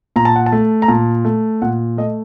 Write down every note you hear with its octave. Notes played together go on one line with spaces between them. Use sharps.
A#2 A#5
A5
F#5
A5
A3
A#5
A#2 A5
A3
A#2 F#5
A3 D#5